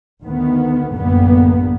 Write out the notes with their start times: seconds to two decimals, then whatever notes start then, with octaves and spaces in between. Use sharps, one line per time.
0.22 D2 D#3 B3
0.95 A1 F#2 D3 G3 A#3 B3